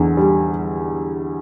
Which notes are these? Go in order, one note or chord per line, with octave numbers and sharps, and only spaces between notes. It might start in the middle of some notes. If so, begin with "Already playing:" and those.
Already playing: E2 D3
G3